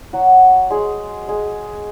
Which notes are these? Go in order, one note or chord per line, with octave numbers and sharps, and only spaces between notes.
F#3 F#4
G#3 G#4
G#3 G#4